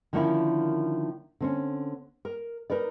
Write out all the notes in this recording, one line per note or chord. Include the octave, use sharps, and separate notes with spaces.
D3 D#3 F3 A#3 C#4 E4
D3 C4 C#4
A#4
D#4 A#4 B4 D5